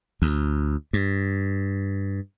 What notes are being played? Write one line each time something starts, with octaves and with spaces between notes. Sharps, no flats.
D2
G2